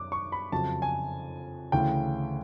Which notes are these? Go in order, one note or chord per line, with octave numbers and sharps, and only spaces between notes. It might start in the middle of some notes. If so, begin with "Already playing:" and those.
Already playing: F#2 D6
C#6
B5
F2 C#3 F#3 A5
G#5
D2 C#3 E3 G5